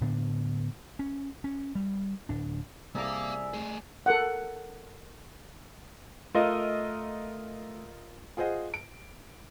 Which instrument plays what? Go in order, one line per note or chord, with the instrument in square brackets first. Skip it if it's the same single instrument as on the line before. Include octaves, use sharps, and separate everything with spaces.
[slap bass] A2 D3 B3 D4
C#4
C#4
G3
D1 D4
[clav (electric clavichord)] C2 A5 [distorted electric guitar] A#3 F5 [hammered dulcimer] G#4 D5 A#5 [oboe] E5
[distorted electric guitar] A3 G#4
[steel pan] A4 A#4 F#5
[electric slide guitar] A3 [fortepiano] F4 A#4 D#5
[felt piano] F4 G#4 C5 D#5 F#5
D7